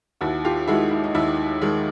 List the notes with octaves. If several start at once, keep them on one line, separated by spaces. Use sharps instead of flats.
D#2 E4 F#4
F4 G4
D#3 G#3 E4 F#4
E4
D#4
D#2 E4
D#3 G#3